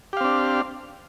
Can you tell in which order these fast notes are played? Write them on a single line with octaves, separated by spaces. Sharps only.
G4 F5 C4 D4